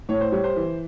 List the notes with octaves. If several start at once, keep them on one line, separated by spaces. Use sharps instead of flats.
A2 C#5
C5
G3 C#5
C5
E3